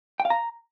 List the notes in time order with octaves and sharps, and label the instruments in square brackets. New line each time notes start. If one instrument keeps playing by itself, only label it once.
[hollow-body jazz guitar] G5
F5
A#5